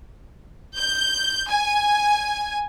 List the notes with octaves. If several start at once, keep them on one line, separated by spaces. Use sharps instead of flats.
G6
G#5